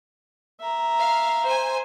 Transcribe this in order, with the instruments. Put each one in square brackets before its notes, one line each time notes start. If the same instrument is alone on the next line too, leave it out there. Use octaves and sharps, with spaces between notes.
[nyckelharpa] E5 A#5
[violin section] F5
C5 G#5